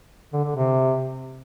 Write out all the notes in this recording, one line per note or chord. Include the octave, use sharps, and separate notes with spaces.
D3
D3
C3